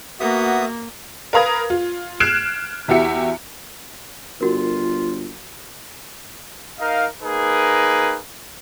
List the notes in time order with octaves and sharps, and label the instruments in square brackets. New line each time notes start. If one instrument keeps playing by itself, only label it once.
[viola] A#3 [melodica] B3 E5 D#6 [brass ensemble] F#4
[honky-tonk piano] A#4 B4 F5 A#5 D#6 G#6
F4
F6 F#6 G#6 C7 D7 E7
E2 E4 F#4 G4 E5 C#7
[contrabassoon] G1 [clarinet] F4 [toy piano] F#4 A#4
[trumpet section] D#4 A#4 D#5 F5
A#3 D#4 G#4 A#4 B4